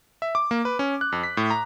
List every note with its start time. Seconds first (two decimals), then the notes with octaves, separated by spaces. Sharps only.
0.22 E5
0.35 D6
0.51 A#3
0.65 B4
0.79 C#4
1.01 F#6
1.12 F2
1.24 B6
1.37 A2
1.50 A#5